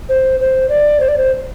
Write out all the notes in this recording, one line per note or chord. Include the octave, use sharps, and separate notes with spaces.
C5
C5
D5
C5
D5
C5